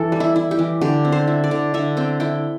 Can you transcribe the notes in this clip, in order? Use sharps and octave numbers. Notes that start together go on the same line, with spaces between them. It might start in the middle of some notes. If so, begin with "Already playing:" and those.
Already playing: E3 A4
G3
E4
E4
G4
E3
D3 G4
C4
C5
E4
D5
D3
D3 E5
C4 G5
E4 G5